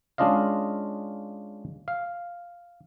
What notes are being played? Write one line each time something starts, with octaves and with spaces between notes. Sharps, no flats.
G#3 C#4 D4 F4 D#5 F5
F5